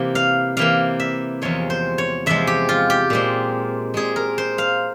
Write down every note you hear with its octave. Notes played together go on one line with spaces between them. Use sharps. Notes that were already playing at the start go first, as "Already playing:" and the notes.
Already playing: C3 E3 A#3
F5
C3 E3 A#3 F5
E5
E2 C3 F3 G#3 C#5
C5
C#5
E2 C3 F3 G#3 E5
G4
F4
G4
A#2 G#3 C4
A#2 G#3 C4 G#4
A#4
C5
F5